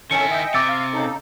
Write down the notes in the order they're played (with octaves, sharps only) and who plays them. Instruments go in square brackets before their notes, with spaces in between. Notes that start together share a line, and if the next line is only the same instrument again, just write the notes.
[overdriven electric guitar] D#3 E4 [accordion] C#4 A4 [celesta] G#5 C#7
[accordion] D#5 E5 G5
[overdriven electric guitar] C3 [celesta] D6 E6 A6
[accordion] F5
C#3 D#4 A4